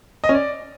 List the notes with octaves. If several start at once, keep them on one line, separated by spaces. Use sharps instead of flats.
D#5
C#4
D5